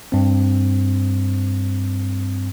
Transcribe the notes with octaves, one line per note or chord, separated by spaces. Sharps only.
G2 C4